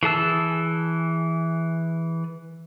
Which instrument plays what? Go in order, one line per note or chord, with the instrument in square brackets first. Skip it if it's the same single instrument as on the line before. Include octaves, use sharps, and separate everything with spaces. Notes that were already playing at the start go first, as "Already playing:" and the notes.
[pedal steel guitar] E3 G#4 A5 E6